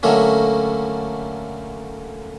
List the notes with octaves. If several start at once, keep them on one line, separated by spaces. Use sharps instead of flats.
D3 F#3 A3 A#3 C#4